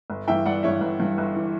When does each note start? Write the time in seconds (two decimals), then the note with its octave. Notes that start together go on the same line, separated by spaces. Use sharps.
0.10 G1
0.28 G2 E3 E5 G5
0.46 G1 D5 F#5
0.63 G2 E3 C#5 E5
0.81 G1
1.00 G2 E3
1.18 G1
1.36 E3